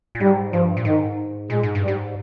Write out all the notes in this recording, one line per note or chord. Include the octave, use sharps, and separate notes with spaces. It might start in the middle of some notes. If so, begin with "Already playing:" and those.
A#2
G#2 G3
G2 F3
A#2
G#2 D#3
A#2 G#3
G#2
G2
G3
G#2